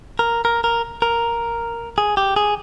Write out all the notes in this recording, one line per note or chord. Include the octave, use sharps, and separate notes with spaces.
A#4
A#4
A#4
A#4
G#4
G4
G#4